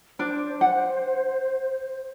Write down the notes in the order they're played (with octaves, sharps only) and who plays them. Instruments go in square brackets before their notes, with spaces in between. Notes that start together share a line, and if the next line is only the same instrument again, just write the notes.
[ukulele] D4 D5 [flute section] C5
[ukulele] F#5